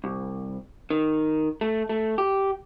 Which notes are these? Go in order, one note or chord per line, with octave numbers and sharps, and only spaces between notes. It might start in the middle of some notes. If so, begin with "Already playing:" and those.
C2
D#3
A3
A3
G4